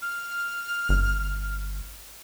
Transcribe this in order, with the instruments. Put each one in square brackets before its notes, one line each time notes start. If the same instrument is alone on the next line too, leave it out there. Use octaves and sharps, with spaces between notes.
[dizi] F6
[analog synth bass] G1